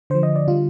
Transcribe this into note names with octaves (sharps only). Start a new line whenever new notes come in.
D3 F3 C5
D#5
D5
D3 G3 F4